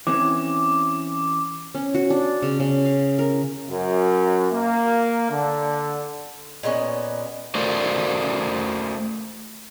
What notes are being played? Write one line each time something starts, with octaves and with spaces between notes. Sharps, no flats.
E3 C4 C#4 D6
C#4
F#4
D4
C#3
C#3
F5
A#4
F#2
A#3
D3
A#2 G#3 B3 C#4
A3 F#4 A#4 C5 D5 F5